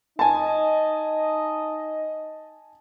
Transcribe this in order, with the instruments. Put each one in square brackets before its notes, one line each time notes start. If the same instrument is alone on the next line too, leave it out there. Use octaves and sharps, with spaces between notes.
[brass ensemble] D#4 D#5 [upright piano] G#5 A5